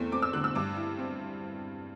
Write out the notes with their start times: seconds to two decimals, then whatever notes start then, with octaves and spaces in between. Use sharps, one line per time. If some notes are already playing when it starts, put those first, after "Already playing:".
Already playing: E2 A3 C4
0.12 C4 D6
0.22 E6
0.33 D3 F#6
0.44 E6
0.55 G2 D6
0.76 E4
0.99 C4